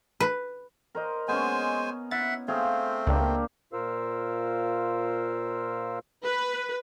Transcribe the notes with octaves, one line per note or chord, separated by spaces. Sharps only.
B4
A#4 C5 D#5
G#3 B3 C#4 C5 G#5
E4 E5 F#5 A6
A3 C4 G#4 C5 F5
C#2 A#3 D4 G4
A#2 F4 A#4 C5 F5 E6
B4